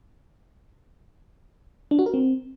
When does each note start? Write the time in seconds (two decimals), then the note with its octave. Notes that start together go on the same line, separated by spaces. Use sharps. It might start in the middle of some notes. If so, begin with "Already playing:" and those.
1.91 D4
1.99 F#4
2.06 A#4
2.14 C4